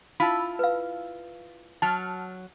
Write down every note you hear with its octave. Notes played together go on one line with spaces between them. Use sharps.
E4 F4 A5 B5
B4 F5
F#3 A5 F6